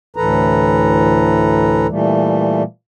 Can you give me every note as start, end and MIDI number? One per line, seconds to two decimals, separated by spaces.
0.16 1.87 38
0.16 1.87 45
0.16 1.87 52
0.16 1.87 69
0.16 1.87 71
0.16 1.87 82
1.89 2.63 46
1.89 2.63 52
1.89 2.63 55
1.89 2.63 57